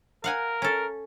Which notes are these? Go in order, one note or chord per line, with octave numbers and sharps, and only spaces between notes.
A#4 F5 F#5 G#5
C#4 A4